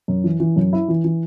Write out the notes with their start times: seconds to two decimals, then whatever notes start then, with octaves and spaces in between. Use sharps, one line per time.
0.08 F#2
0.24 E3
0.40 E3
0.56 F#2
0.73 E4
0.88 E3
1.04 E3